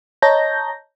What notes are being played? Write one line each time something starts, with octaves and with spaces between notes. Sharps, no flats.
C#5 D#5 A5 A#5 G6 A#6